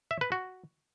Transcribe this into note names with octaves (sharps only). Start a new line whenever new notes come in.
E5
B4
F#4